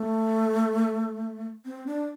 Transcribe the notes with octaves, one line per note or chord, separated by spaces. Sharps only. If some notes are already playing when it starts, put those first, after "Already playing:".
Already playing: A3
C4
D4